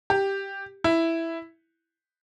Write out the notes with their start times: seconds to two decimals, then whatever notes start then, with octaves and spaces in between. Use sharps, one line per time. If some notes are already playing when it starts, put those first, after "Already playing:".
0.10 G4
0.84 E4